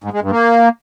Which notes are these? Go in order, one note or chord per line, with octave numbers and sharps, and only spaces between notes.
G#2
G#3
G2
A#3